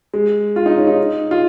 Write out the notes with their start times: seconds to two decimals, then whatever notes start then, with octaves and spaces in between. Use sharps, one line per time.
0.14 G#3
0.56 F4
0.66 D#4
0.77 C#4
0.87 D#4
1.31 F4